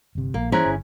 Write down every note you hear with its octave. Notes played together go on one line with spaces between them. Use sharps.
G1 C3
A#1 A#3
E3 C#4 E4 G#4 C5 A#5 F#6
G1